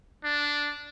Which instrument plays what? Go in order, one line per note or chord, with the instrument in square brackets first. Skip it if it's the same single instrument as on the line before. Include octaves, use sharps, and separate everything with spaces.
[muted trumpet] D4